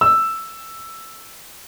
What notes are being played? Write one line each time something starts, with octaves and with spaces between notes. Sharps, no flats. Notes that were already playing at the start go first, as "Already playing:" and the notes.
E6